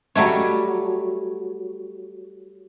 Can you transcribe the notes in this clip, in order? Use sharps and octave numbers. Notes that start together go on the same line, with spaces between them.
F#3 G3 A3 C#5